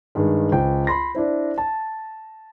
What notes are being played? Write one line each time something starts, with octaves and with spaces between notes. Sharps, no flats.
G2 D#3 G#3
C#2 C5 G5
B5 C6 A#6
D4 E4 C5
A5